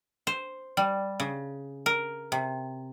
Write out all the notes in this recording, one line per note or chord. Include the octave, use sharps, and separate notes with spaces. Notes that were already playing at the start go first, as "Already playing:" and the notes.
C5
G3
C#3
A#4
C3